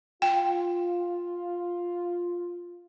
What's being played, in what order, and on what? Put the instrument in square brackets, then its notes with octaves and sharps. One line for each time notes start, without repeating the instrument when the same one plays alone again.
[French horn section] F4 [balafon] G5